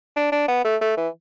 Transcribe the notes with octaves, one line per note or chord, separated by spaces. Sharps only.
D4
D4
B3
A3
A3
E3